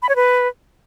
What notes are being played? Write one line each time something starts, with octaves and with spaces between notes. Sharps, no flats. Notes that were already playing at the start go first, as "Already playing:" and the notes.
B5
C#5
B4